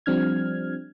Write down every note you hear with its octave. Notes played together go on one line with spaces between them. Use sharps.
F3 G3 C4 D4 F6 G#6